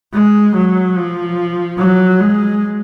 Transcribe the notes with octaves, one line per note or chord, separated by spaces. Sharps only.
G#3
F#3
F3
F#3
G#3